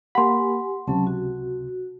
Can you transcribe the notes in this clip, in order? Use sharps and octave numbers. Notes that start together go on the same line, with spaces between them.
A#3 G4 F#5 G#5 B5 C6
C#2 C3 F#3 C#4 A5
F#4